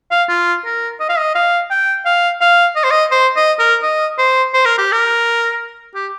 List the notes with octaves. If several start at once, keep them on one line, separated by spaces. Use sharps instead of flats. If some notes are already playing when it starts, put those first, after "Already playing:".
F5
F4
A#4
D#5
F5
D#5
F5
G5
F5
F5
D#5
C5
D#5
C5
D#5
A#4
D#5
C5
C5
A#4
G4
A#4
G4